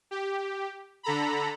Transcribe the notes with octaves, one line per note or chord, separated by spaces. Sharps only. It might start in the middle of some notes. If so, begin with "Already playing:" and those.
G4
D3 A4 A#5 B5